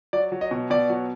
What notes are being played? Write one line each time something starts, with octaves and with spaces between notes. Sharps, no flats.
F#3 D5
F#3
D#5
B2
B2 D5
F#3